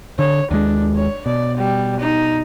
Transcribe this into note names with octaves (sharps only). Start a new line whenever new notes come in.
D3 C#5
D#2 G#3 D4
C#5
B2 D5
G3
D#4